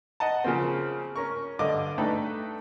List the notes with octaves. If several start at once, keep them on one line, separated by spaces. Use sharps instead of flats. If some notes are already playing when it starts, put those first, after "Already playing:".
D#5 F#5 A5
C#3 F3 A#3 C4
C#4 A#4 C#6
G2 D3 D#5 F5 D6
A3 D4 D#4 A4 B4 G5